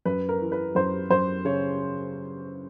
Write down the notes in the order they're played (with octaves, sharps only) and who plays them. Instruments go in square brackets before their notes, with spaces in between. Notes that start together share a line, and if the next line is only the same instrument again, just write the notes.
[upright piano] F#2 B4
A#4
E3
B4
F#2 C5
F#2 C5
C#3 C#5